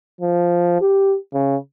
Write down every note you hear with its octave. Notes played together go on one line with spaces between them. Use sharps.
F3
G4
C#3